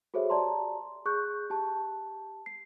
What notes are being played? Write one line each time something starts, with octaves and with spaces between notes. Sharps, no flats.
F#4 G#4 A4 C5 C#5 E5
G4 D5 A5 A#5 C6
G#4 C#6 F#6 G6
G4 A5
C7